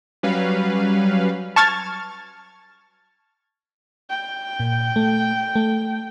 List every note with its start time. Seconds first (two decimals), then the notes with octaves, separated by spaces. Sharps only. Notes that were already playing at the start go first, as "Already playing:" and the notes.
0.23 F#3 G3 C#4 B4 F5
1.56 A5 C#6 F6 G#6 A6
4.10 G5
4.60 A#2
4.96 A3
5.55 A3